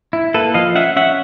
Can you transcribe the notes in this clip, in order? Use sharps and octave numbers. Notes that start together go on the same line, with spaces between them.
E4
A#3 A4 B4
F3 D#5 F5
C#4 E5 F#5
C#4 E5 F#5